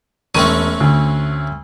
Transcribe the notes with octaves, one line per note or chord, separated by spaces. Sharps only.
E1 A3 C4 C#4 D#7
D2